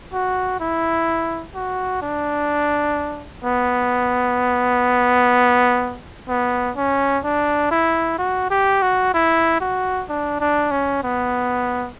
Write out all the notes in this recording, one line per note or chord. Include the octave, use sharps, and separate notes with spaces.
F#4
E4
F#4
D4
B3
B3
C#4
D4
E4
F#4
G4
F#4
E4
F#4
D4
D4
C#4
B3